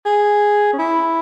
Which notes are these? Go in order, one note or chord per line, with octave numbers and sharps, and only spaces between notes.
G#4
C#4
E4